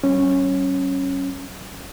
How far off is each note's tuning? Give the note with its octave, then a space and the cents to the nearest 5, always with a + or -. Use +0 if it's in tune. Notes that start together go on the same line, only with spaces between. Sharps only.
F#3 +45 C#4 -15